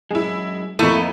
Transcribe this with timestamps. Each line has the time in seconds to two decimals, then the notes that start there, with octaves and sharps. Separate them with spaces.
0.11 F#2 G#3 E4 G#4
0.79 F2 A3 A#3 D#4 E4 D#7